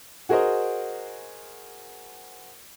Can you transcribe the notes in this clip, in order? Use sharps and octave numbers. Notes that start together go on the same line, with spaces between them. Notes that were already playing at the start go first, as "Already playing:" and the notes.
F#4 G#4 A#4 C5 D#5